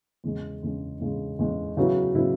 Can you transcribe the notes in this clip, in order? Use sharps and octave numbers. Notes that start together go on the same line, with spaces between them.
E2 C#3 G#3
E2 C#3 G#3
E2 C#3 G#3
E2 C#3 G#3
C#3 F#3 B3 E4 B4
C#3 F#3 B3 E4 B4